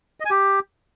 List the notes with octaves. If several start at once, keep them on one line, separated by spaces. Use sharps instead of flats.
D#5
G#5
G4